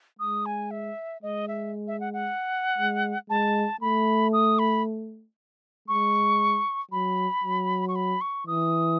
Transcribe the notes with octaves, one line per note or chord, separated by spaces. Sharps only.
G#3 D#6
G#5
E5
G#3 D#5
E5
E5
F#5
F#5
G#3
G#3 A5
A3 B5
D#6
B5
G#3 C#6
F#3 B5
F#3
C#6
B5
C#6
E3 D#6